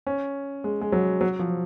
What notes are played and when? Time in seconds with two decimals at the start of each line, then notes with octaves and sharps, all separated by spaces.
0.07 C#4
0.64 G#3
0.81 G#3
0.92 F#3
1.21 F#3
1.39 F3